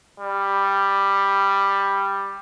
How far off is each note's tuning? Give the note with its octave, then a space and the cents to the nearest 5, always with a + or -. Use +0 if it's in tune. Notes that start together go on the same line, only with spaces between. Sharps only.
G3 +10